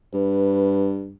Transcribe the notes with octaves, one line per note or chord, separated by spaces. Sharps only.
G2 B4